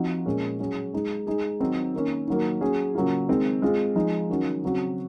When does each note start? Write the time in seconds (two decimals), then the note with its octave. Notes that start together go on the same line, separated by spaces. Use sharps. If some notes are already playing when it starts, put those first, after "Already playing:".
Already playing: F3 C4 D#4 F#4
0.26 A#2 G#3 C#4 G#4
0.60 F#3 C#4 G#4
0.93 G#3 D#4 G#4
1.27 G#3 D#4 G#4
1.60 D#3 F#3 C4 D#4
1.94 D#3 A#3 C#4
2.28 D#3 F#3 A#3
2.61 F#3 C#4 G#4
2.95 C#3 F#3 A#3 F4
3.28 D#3 G#3 C4
3.62 G#3 C4 F4 G#4
3.95 F3 G#3 D#4 G#4
4.29 D#3 F#3 C#4 F#4
4.63 C#3 F#3 C4 F#4